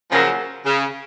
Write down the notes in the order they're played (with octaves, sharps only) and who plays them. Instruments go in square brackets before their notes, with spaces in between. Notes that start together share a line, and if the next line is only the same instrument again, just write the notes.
[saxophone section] C#3 F3 [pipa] F#3 A#3 C#4
[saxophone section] C#3